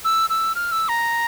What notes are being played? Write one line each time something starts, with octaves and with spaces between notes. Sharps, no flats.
E6
E6
F6
E6
A#5